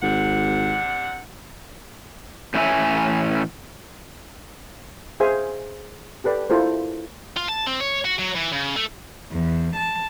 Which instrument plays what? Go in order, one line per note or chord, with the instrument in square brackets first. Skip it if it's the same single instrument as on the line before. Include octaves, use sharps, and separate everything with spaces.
[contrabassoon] G#1 [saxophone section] C3 D4 F#5
[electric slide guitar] A2 E3 C#4 E4 E5 G#5
[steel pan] G#4 C5 E5 F5 G#5
G4 A4 B4 D5 G5
E4 F4 A4 A#4 C5
[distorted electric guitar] F4
A5
C4
C#5
F#4
F#3
E3
C#3
A3
[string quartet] E2
A5